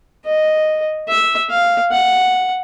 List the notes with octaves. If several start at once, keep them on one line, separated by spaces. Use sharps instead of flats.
D#5
E5
F5
F#5